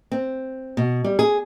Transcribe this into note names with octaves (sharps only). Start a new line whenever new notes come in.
C4
B2
G3
G#4